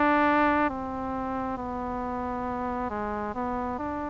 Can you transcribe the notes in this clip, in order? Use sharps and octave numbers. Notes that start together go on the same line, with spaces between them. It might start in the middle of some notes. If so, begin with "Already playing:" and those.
Already playing: D4
C4
B3
G#3
B3
D4